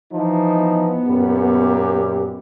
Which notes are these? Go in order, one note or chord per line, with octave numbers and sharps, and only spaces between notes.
E3 F3 D#4
B3
F#2 A#2 G4